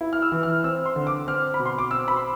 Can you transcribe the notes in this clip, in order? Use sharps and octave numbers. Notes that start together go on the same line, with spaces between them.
E4
F6
E6
E3
F6
C4 E6
C6
D3
D6
C4 F6
B5
B2
C6
D6
C4 E6
B5
C6